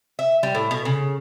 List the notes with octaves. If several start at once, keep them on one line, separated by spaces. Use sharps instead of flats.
E5
G3
A2
B2
C#3